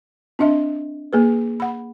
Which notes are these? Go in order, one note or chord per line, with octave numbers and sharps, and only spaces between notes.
C4 D4 D#5 E5
A#3 G#4 B4
F#5 B5